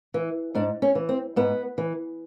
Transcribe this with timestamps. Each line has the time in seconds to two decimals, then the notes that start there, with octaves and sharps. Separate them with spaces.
0.14 E3
0.55 G#2 D4
0.82 C#4
0.95 E3
1.09 C4
1.36 G#2 B3
1.78 E3